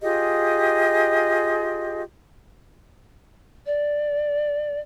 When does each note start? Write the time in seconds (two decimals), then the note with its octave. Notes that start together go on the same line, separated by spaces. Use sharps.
0.01 F4 G4 G#4 D#5
3.66 D5